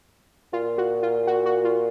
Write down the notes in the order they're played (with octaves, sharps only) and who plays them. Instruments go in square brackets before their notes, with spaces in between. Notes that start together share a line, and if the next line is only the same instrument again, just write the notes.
[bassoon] A#2 [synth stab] F4
[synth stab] F#4
F4
F#4
F#4
F4